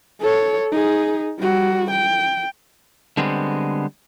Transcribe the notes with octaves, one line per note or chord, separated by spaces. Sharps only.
A4 C#5
D#4 G#4
G3 F#4
G5
D3 G3 G#3 B3 C4